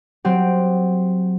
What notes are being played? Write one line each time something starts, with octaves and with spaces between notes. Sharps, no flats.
F#3 C4 G4